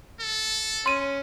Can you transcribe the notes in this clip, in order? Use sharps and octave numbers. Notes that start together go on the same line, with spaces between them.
A4
C#4 C6 D#7